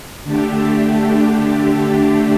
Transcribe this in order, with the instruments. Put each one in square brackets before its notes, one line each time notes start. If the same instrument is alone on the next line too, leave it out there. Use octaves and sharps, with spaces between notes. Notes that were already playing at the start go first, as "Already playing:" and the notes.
[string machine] D3 A3 D4 G4